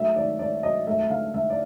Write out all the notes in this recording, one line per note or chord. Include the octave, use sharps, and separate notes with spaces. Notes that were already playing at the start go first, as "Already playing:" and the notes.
Already playing: F#3 A3 E5
D#3 D5
D#3 D5
F#3 D#5
A3 E5
E5
D3 F5
D3 E5
D5